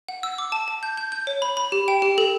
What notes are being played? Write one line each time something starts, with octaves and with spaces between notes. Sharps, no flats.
F#5
E6
D6
A5
A5
G6
G6
G6
C#5
B5
B5
G4
G5
G4
A4